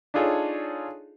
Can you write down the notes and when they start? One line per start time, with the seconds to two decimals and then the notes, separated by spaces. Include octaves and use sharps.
0.14 D4 D#4 F4 G#4 A4 C#5